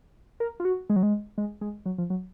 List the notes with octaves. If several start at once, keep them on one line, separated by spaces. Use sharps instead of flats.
A#4
F4
F#4
G#3
F#3
G#3
G#3
G#3
F#3
F3
F#3